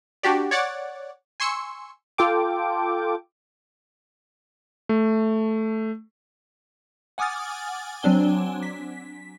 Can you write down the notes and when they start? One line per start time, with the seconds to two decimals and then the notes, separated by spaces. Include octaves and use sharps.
0.23 D4 F#4 G4 D5
0.51 C#5 D5 F#5 D6 A6
1.40 G#5 C6 C#6 E6 C#7
2.18 F4 A4 G5 D6
4.89 A3
7.18 F#5 G#5 D6 D#6 F6 A6
8.03 F#3 C4 D4 G#5 G7
8.63 B6